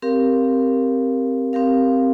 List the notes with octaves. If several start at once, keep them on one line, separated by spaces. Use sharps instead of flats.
C4 G4 A#4 F5
C4 G4 A#4 F5